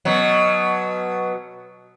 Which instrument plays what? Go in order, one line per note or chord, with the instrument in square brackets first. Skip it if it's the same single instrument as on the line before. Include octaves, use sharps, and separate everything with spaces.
[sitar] B2 F#3